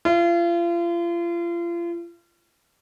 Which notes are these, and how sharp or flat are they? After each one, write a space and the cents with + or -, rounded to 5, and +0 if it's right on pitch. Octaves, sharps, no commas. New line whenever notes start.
F4 -35